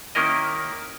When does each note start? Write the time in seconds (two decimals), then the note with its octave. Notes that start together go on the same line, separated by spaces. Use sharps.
0.15 D#3 A#3 C#4 E4 A#4 D#5